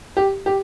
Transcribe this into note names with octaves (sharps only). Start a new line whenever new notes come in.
G4
G4